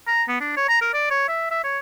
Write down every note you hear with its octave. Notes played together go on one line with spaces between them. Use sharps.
A#5
B3
D4
C#5
A#5
A#4
D5
C#5
E5
E5
C#5